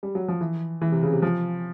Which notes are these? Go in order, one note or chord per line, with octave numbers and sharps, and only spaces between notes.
G3
F#3
F3
E3
E3
C3
C#3
C3
F3